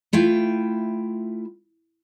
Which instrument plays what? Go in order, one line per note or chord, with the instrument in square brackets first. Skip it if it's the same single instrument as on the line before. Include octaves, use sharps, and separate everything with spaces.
[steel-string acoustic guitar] A3 E4 F4 G5